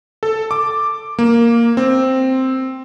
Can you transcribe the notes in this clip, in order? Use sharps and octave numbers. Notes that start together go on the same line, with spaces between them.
A4
D6
A#3
C4